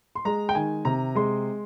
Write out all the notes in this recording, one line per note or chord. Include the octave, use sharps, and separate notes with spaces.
C6
G#3 A#5
G5
D#3 G#5
C3 A#5
G#3 C6